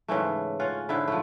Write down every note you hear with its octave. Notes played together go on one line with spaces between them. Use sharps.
G#2 C#3 E3 A3
C#4 F4 F#5
G#2 D3 E4
F3 A3